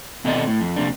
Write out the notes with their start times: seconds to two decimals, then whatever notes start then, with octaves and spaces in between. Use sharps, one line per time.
0.25 B2 D#3 C4 A4 D5 D#5
0.47 A2
0.61 F2
0.76 F2 C3 A#3 D4